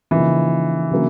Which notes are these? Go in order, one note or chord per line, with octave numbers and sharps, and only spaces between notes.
C#3 E3 F3 A#3 D#4
C#3 F#3 A#3 D4